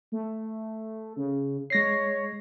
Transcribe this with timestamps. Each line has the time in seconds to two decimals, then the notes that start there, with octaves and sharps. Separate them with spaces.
0.12 A3
1.16 C#3
1.70 G#3 C#5 A#6 C7